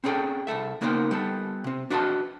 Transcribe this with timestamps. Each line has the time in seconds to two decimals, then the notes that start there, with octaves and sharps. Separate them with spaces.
0.04 C4 C#4 E4 G#4 A4 G5
0.47 C2 G#2 A4 E5
0.81 C#3 A#3 B3 D#4 A#4 C5
1.11 G3 B3 A4
1.64 C3 C4
1.90 D4 F#4 B4 C5 D#5 A5